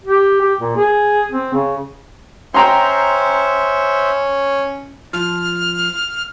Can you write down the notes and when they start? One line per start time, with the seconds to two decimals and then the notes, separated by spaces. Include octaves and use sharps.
0.04 G4
0.41 G4
0.59 A#2
0.77 G#4
1.32 C4
1.54 C#3
2.54 C#4 C5 E5 G5 A#5 C6
5.13 F3 F6